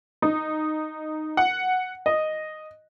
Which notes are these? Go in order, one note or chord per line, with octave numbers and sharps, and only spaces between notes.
D#4
F#5
D#5